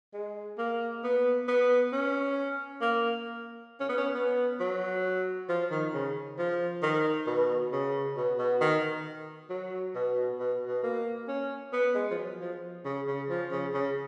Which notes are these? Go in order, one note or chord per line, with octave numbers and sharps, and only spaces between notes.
G#3
A#3
B3
B3
C#4
A#3
C#4
B3
C#4
B3
F#3
F3
D#3
C#3
F3
D#3
B2
C#3
B2
B2
D#3
F#3
B2
B2
B2
A#3
C#4
B3
G#3
F3
F#3
F3
C#3
C#3
F3
C#3
C#3